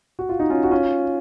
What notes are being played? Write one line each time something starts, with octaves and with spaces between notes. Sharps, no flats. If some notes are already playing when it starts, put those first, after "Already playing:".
F#4
F4
D#4
C#4 F4
F#4
C#4 F4